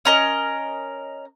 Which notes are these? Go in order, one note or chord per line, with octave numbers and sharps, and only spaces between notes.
C#4 A#4 D#5